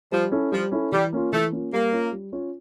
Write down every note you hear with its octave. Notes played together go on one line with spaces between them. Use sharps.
F3 G3
C#4 E4 A4
F3 G3
C#4 E4 A4
E3 G3
A#3 C#4 F4
E3 A3
A#3 C#4 F4
G3 A#3
C#4 F4 C#5
G3
C#4 F4 C#5